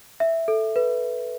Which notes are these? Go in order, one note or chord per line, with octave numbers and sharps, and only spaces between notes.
E5
A4
B4